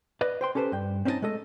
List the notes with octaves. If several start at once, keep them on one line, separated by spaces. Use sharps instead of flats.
B4 D5 D#5
C5 G5 C6
C#4 G4 A4 B4 C5
G2 G5
C4 C#4 D#4 F#4 D#5 A5
G#3 A3 A4 D#5